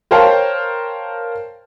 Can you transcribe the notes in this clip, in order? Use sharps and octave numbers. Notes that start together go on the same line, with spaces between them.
A#4 C5 C#5 F5 G5 A5